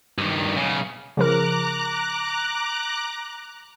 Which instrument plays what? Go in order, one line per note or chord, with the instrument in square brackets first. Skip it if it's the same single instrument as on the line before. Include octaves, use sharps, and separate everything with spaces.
[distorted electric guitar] G2 D#3
B1 C#3
[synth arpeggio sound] C#3 F3 A#4 [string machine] A#5 D6 F#6